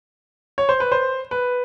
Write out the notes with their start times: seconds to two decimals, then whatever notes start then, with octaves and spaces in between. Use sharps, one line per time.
0.58 C#5
0.69 C5
0.80 B4
0.92 C5
1.31 B4